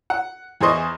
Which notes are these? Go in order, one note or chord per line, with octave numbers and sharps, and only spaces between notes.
F#5
E2 E3 G#4 C5 D#5 C#6